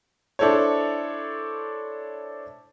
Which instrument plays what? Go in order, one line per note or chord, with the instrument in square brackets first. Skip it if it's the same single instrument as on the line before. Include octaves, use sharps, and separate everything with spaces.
[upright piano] D4 E4 A4 C5 C#5